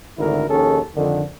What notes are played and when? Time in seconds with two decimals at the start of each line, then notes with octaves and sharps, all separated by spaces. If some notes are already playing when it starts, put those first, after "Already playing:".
0.18 G#1 D2 D3 D#3 E4 A#4
0.48 A#1 D#2 D#3 C#4 G#4 A4
0.95 F2 D3 D#3